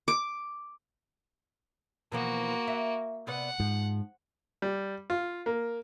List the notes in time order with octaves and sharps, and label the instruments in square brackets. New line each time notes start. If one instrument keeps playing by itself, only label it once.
[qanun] D6
[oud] B2 E3 F3 [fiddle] A#3 F#4
[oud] E5
[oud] C3 B3 D5 [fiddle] F#5
[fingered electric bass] G#2 [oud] F3
[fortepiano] G3
F4
A#3